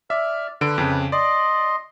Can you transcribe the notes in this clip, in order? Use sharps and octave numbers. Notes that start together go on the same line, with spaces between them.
D5 E5 F6
D3 B4 D7
F2 C#3
D5 D#5 C6